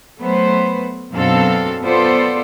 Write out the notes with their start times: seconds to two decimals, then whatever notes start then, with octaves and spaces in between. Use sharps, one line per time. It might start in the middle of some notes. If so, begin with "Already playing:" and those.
0.19 F#3 A3 B3 B4 C5
1.12 F#2 B2 C4 D4 A4 F5
1.84 B3 F4 A4 C5 D5